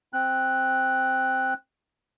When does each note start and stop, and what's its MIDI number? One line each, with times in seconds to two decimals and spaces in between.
0.13 1.54 60
0.13 1.54 90